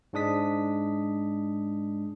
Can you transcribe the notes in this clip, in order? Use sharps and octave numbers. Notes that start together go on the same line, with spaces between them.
G#2 G#3 D4 D#6 B6